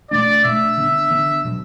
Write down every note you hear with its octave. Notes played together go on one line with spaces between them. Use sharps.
B2 A3 D4 D5
B2 A3 D4 E5
D3 B3 D4
D3 B3 D4
B2 F#3